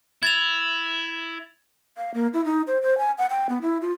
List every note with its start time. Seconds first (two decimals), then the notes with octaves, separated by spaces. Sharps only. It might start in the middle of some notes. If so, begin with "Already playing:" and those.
0.23 E4 G#6 A6 F7
1.97 F5
2.14 A#3
2.33 E4
2.45 D#4
2.67 C5
2.82 C5
2.98 G#5
3.18 F#5
3.30 G5
3.49 B3
3.62 E4
3.81 F4